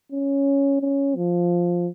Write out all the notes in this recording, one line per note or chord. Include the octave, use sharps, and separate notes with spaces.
C#4
C#4
F3